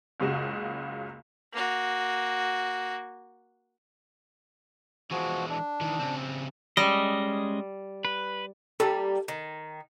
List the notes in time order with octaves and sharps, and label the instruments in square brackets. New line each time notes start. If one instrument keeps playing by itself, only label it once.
[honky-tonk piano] F#1 C#2 C#3 F#4
[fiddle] A#3 F#4
[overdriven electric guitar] E3 G#3 [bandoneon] F3 F#4
[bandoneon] D4
[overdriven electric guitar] D#3 E3
C#3 C4
[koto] G3 [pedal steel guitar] G#3 C#4 D#5
[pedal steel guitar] B4
[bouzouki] G3 A#3 [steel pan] A4
[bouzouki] D#3